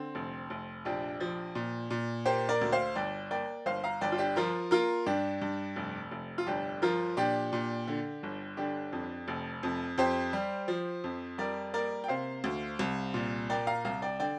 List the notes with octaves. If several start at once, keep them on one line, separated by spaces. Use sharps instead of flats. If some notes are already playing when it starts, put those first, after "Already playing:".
Already playing: D3 C4
F1
F1
A#1 D4 G4
F3
A#2
A#2
A#3 G4 C5
A#4 D5
D2
C5 F5
G1 D5 G5
A#3 D5 G5
G1 C5 F5
F5 A#5
G1 D5 G5
F4
D4 G4
F3 F4 A#4
A#3 F4 A#4
G2 D4 G4
G2
F1
F1
F4
G1 D4 G4
F3 F4 A#4
A#2 D4 G4
A#2
D3
G1
D3 D4 G4
F2
F1
F2
F2 G4 C5
G3
F3
F2
G3 A#4 D5
A#3 A#4 D5
G5
C3 C5 F5
D2
C2
A#2
A#3 D5 G5
F5 A#5
C2 F5 A#5
D5 G5
D3 D5 G5